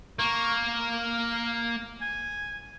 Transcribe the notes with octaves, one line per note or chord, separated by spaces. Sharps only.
A#3 C#6
F5
G#5